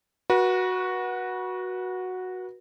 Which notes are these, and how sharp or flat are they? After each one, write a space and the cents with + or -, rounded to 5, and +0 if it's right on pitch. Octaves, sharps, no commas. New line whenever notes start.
F#4 -5 B4 -35